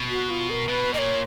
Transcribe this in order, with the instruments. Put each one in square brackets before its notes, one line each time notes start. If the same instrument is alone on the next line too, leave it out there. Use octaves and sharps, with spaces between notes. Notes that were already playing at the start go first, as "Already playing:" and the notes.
Already playing: [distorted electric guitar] B2
[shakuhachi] F#4
F4
A#4
[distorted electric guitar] B2 [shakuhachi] B4
[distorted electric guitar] A#2 [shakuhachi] C#5 D#5